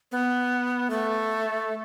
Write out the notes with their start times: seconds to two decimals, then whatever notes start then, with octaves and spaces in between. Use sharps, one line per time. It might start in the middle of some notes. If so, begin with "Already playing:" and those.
0.12 B3
0.90 A3